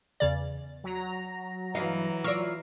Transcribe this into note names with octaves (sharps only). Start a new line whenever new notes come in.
E2 C#3 D5
F#3 A#5
G2 E3 D#5 F5
F4 D5 C#6 E6 A#6